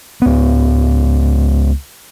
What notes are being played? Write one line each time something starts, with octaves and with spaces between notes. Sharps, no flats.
C#2 B3